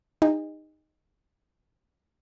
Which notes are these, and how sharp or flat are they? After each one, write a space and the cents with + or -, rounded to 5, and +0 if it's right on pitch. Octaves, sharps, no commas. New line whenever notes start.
D#4 -10 G#4 -45